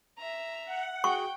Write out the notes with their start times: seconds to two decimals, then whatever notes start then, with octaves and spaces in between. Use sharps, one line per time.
0.18 E5 A#5
0.65 F#5
1.04 F#4 G#4 G5 C#6 G6